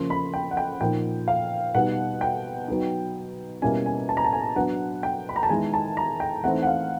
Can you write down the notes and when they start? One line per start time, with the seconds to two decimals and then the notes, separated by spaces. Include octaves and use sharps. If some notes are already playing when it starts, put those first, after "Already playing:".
Already playing: C#3 F3 A#3 C6
0.10 B5
0.34 G5
0.51 F#5
0.57 G5
0.81 A#2 F3 A#3 D#4 G5
1.28 F5
1.75 B2 G3 B3 D#4 F#5
2.21 G5
2.68 F#3 B3 D#4
3.62 B2 G3 A#3 C#4 E4 G#5
3.86 G#5
4.09 A5
4.17 A#5
4.25 A5
4.33 G#5
4.56 F#3 B3 D4 F#5
5.03 G5
5.29 B5
5.36 A#5
5.43 A5
5.50 D#3 G#3 B3 E4 G#5
5.74 A5
5.97 A#5
6.20 G5
6.44 E3 A3 C4 D#4 F#5
6.63 F#5
6.67 F5